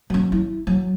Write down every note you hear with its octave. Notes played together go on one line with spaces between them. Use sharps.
F#3 C#4
E4
F#3